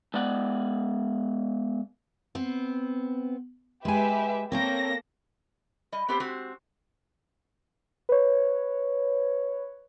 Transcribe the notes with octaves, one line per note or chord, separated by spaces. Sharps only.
G#3 B3 D5 F#5
B3 C4
G#3 G4 B4 E5 G#5
A#3 C4 A4 C#5 G5 A#6
G3 D#5
B3 C4 G4 A4 C5
G#3 C4 F#4 G4
B4 C#5